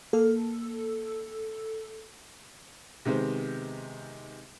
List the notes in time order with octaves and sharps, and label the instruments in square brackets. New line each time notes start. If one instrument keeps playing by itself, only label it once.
[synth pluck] A#3 F6 [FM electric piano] A4
[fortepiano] C3 D#3 G#3 B3 C5